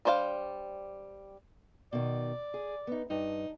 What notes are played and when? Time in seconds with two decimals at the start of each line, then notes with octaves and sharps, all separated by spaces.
0.05 G3 D4 C5 C#5 F5
1.93 B2 D#3 D5
2.54 G#4
2.87 B3 D#4
3.10 G2 D#4